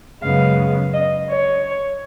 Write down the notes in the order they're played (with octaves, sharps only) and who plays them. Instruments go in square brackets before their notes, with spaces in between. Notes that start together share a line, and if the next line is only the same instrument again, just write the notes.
[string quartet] F#2 C#3 G#3 B3 F5
D#5
C#5